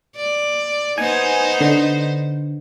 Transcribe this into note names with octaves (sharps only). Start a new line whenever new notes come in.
D5
B3 D#4 C5 G#5
D3